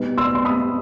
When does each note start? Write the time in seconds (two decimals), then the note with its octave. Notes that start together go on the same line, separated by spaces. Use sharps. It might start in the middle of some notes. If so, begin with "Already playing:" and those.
Already playing: B2 G3 B3 D#4
0.18 C6 E6
0.35 C6
0.45 B5 D#6